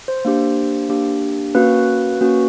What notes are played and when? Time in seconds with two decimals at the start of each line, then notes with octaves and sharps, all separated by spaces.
0.08 C5
0.25 A#3 D4 G4
0.89 A#3 D4 G4
1.55 A#3 C#4 F#4 B4
2.20 A#3 C#4 F#4